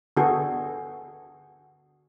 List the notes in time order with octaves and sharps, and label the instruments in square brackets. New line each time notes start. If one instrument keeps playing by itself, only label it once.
[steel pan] D3 B3 F#4 G#4 A4